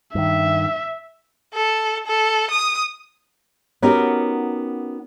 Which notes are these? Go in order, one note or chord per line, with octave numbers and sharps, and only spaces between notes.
G2 D#3 E5
A4
A4
D#6
B3 C#4 D#4 F#4 G4 A#4